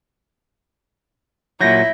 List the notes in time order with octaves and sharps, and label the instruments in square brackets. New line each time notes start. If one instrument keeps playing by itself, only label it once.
[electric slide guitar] A#2 F#3 [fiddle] E4 [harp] G6 A#6